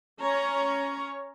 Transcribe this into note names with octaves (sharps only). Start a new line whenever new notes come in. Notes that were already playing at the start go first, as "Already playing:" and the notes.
C#4 C#5 A#5